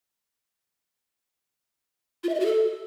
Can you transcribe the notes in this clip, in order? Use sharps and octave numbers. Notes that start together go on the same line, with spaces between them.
F4
E5
D#5
F#4
A4